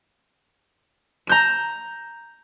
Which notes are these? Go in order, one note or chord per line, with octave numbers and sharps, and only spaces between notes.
A#5 G6 E7